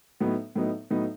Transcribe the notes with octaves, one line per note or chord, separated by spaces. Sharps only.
A2 F#3 B3 D#4
A2 F#3 B3 D#4
A2 F#3 B3 D#4